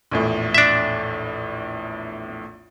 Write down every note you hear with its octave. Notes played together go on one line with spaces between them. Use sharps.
A#1 E2 A2
D4 E5